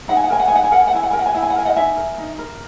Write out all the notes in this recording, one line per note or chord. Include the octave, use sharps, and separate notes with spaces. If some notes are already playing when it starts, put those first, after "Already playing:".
D#4 F#5
G#5
F#5
A#4 G#5
F#5
D#4 G#5
F#5
G#5
A#4 F#5
G#5
F#5
E4 G#5
F#5
A#4 G#5
F#5
G#5
E4 F#5
G#5
F#5
A#4 G#5
D#5 F#5
D#4 E5 G#5
A#4
D#4
A#4